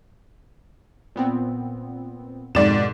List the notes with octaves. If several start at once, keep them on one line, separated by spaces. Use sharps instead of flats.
A#2 B3 C4
F2 G#2 B2 D#3 D5 E7